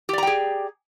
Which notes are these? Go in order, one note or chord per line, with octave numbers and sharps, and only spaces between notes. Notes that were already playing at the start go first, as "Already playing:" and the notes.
G4 G#4 D5 G5 A#5